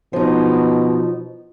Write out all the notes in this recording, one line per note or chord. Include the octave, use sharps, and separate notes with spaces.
B2 F3 D#4